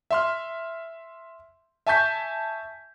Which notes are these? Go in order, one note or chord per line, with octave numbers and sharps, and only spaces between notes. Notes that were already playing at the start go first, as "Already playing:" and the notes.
E5 C6 F6
E5 G#5 A5 C#6 G6 B6